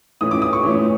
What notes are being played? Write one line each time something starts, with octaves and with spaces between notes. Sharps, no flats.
A2 E3 A3 C#4 D#6
D6
D#6
C#6
A2 E3 A3 C#4